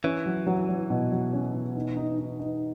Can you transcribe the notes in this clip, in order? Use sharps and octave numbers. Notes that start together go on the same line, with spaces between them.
E3 C#4
F#3
F#3
F#3
B2
F#3
C#4
B2
D#4
D#4
D#4
D#4